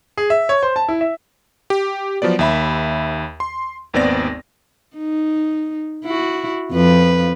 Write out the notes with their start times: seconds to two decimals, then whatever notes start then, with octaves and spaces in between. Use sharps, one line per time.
0.17 G#4
0.30 E5
0.49 C#5
0.63 C5
0.76 A5
0.89 E4
1.01 E5
1.70 G4
2.22 F3 F#3 B3 D5
2.39 D#2 E5 B5
3.40 C6
3.94 G#1 D#2 B3 C4 D5 A#6
4.97 D#4
6.05 E4 F#4
6.72 F2 F3 B4